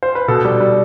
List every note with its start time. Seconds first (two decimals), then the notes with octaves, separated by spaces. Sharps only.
0.03 C5
0.15 B4
0.28 B2 A4
0.45 G3
0.60 G3